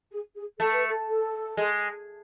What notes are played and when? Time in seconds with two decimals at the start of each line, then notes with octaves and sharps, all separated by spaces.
0.11 G#4
0.36 G#4
0.60 A3 A4
0.73 B4
0.87 A4
1.09 A4
1.57 G#3